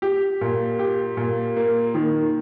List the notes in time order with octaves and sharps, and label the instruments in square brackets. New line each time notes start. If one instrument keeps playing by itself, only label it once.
[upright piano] G4
A#2
G4
A#2
A#3
D#3